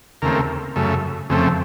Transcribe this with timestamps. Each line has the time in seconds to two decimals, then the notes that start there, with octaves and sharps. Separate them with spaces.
0.22 D#2 C#3 A3 C4 A#4
0.76 F#2 C#3 A3
1.30 F2 C#3 A3 C4